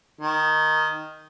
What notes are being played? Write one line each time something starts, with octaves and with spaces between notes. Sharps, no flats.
D#3